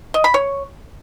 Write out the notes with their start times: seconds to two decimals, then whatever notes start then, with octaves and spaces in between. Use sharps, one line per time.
0.14 D#5
0.24 B5
0.34 C#5